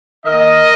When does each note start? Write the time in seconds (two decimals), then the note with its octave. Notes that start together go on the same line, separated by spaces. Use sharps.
0.25 D#3 A#3 A#4 D#5